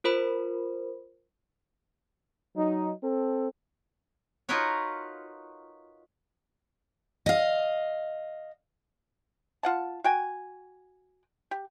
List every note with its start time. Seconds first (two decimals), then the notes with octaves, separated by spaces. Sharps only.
0.04 F4 A#4 C5 B5
2.56 F#3 D#4
3.03 C4 A4
4.49 D#4 F4 F#4 A#4 B4 C#5
7.26 D#5 F5
9.63 F4 F#5 A5
10.04 F#4 G5 G#5
11.51 G4